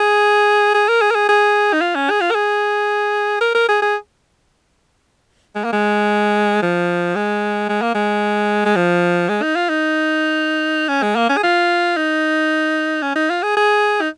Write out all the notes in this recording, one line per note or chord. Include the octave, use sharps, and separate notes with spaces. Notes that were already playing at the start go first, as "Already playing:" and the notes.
Already playing: G#4
G#4
A#4
G#4
A#4
G#4
G#4
D#4
F4
C#4
G#4
F4
A#4
G#4
A#4
A#4
G#4
G#4
G#3
A#3
G#3
F3
G#3
G#3
A#3
G#3
G#3
F3
G#3
D#4
F4
D#4
C#4
G#3
A#3
C#4
G#4
F4
D#4
C#4
D#4
F4
G#4
G#4
D#4